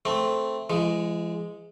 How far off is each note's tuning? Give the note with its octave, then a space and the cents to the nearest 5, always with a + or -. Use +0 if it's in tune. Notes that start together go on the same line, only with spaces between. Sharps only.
A3 +0 C4 +0
E3 +45 G#3 +0